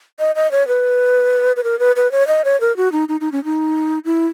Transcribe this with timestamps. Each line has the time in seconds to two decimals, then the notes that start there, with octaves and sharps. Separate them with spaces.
0.19 D#5
0.35 D#5
0.52 C#5
0.68 B4
1.56 B4
1.64 A#4
1.79 B4
1.96 B4
2.12 C#5
2.28 D#5
2.45 C#5
2.61 A#4
2.77 F#4
2.92 D#4
3.09 D#4
3.21 D#4
3.32 C#4
3.45 D#4
4.05 E4